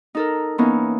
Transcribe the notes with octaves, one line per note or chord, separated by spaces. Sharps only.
D#4 A4 A#4
E3 A#3 B3 C#4 D#4